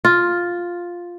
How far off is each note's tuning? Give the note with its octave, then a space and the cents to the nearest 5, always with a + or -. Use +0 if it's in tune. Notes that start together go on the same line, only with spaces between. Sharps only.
F4 +5